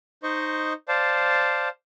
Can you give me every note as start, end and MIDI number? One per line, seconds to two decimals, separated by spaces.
0.23 0.73 63
0.23 0.73 72
0.23 0.73 75
0.23 0.73 85
0.88 1.69 72
0.88 1.69 74
0.88 1.69 77
0.88 1.69 81